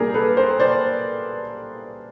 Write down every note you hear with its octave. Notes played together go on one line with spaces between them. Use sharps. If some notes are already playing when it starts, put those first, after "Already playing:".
Already playing: A#2 G3 A#3 D4 G4 G#4 A#4
A4 B4
A#4 C5
C5 D5